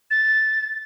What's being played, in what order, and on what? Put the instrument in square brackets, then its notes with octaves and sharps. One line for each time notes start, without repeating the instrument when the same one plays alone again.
[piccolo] A6